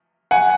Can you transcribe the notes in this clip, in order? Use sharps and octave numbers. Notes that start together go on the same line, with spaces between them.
F#5 G#5